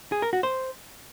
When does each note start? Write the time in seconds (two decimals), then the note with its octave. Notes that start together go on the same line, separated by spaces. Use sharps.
0.12 G#4
0.22 A#4
0.33 F#4
0.43 C5